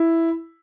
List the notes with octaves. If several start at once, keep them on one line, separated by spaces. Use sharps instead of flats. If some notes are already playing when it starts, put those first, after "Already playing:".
Already playing: E4